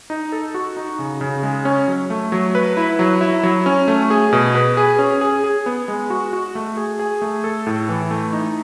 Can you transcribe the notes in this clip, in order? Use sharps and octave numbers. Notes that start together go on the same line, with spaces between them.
D#4
A4
F#4
D#4
C#3
C#3
G#3
C#4
F#3
A3
F#3
B4
E4
F#3
E4
F#3
C#4
A3
G#4
B2
B4
G#4
C#4
G#4
G#4
B3
G#3
F#4
F#4
A3
G#4
G#4
A3
A4
A2
E3
A3
D#4